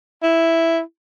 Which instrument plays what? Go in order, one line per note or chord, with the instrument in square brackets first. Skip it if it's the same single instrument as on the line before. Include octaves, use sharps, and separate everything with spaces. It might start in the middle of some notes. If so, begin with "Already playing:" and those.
[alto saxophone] E4